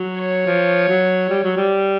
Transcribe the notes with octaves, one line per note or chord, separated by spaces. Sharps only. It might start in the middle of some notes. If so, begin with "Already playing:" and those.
Already playing: F#3
C#5
F3
F#3
G3
F#3
G3